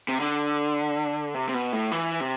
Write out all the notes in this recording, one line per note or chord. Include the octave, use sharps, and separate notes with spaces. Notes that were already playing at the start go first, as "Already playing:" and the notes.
C3
D3
C3
C3
B2
A2
E3
C3